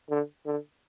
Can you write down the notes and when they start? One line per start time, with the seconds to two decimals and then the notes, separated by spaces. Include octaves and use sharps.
0.10 D3
0.46 D3